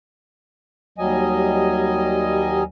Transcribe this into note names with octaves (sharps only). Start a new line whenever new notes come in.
D#2 F#3 G3 D#5 G#5